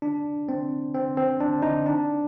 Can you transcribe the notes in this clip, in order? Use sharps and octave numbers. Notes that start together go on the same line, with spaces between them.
D4
C4
C4
C4
D4
D#4
D4